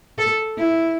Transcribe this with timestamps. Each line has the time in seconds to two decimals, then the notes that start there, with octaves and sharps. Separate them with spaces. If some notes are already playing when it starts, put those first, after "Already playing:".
0.18 A4
0.58 E4